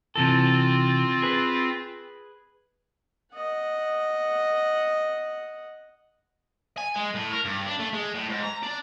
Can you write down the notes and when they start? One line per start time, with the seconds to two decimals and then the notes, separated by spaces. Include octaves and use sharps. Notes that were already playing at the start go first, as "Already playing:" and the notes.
0.16 C3 E3 C4 F4 A4
1.22 G#4 B4
3.34 D#5 F#5
6.77 G#5
6.95 G#3
7.14 A2
7.32 A#4
7.45 G2
7.67 D4
7.79 A3
7.93 G#3
8.14 A2
8.29 G#2
8.43 A#5
8.63 D4